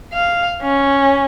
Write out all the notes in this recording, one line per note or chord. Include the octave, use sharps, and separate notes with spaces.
F5
C#4